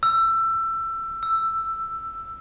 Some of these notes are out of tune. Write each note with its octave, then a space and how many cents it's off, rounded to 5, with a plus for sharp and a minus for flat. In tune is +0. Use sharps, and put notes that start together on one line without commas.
E6 +20
E6 +10